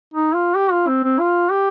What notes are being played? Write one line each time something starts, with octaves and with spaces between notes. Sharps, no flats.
D#4
F4
G4
F4
C4
C4
F4
G4